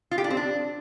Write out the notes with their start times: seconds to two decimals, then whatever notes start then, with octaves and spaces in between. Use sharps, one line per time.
0.11 F4
0.18 G4
0.24 D4
0.30 C4
0.37 D4